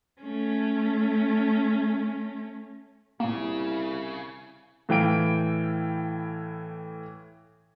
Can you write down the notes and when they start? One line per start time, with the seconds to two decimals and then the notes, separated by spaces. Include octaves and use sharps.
0.21 A3 C#4
3.20 C2 A#2 C#3 A#3 E4
4.89 A2 E3 F5 G5 D7